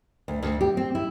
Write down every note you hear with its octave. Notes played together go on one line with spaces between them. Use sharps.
D2
D2
G4
C4
E4